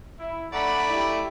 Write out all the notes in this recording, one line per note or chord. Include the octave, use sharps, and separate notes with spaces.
E4
A3 D4 D5 F#5 A#5 B5
E4 G4